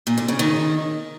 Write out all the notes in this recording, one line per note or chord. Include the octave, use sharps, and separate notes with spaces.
A#2
D3
C#3
D#3